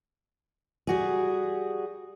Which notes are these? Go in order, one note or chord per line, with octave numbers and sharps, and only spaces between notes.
G3 F#4 G#4